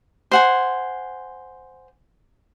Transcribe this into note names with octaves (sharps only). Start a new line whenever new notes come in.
C5 F#5 G#5